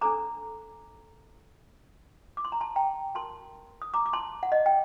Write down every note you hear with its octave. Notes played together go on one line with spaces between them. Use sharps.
D4 A4 C5 A#5 D6
D6
C6
A#5
A5 C6
G5 A#5
F#4 A#4 A5 C6
D#6
A#5 D6
D6
A5 C6
F#5
D#5
G5